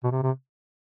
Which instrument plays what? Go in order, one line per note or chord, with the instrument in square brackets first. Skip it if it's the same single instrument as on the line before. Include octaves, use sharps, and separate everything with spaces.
[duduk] B2
C3
C3